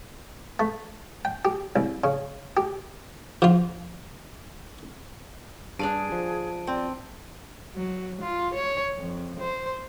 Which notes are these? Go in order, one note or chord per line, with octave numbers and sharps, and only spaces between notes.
A3
G5
G4
C2
C#3
G4
F3 F4
G2 D4 G#4 D5 F5 A5 D7 D#7
F3
C4 D5
F#3
F4
C#5
F2
C5